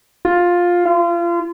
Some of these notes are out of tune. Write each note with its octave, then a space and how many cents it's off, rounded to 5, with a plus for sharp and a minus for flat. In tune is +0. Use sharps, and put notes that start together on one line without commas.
F4 +10
F4 -30